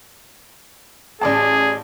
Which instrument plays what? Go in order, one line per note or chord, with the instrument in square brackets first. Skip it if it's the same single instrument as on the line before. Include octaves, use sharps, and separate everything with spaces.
[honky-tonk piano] A1 D5 A5 [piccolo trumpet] G#4